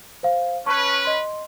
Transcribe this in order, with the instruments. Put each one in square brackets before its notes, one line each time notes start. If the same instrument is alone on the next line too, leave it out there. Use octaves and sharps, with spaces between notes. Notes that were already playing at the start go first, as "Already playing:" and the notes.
[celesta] C5 F5
[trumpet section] C#4 B4 [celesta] A5 C#6
[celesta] D#5 C6